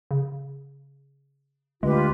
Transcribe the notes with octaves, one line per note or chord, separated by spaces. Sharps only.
C#3
D2 G#3 F4 G4 B4